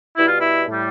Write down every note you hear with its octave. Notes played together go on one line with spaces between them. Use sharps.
B2 G3 E4
F4
E4
A2 G3